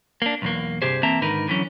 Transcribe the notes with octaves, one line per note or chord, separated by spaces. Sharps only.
A#3 D4
B1 E2 A#3
G2 C3 G4 G#4 C5
E3 A#3 C4 E5 A5 A#5
G#2 D3 D#3 D#4 A#4 B4
D3 E3 F#3 C#4